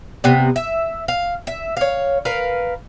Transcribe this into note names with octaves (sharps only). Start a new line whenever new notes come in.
C3 B3
E5
F5
E5
C#5 F5
A#4 B4 F5